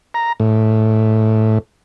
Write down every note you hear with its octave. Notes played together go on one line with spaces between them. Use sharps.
A#5
A2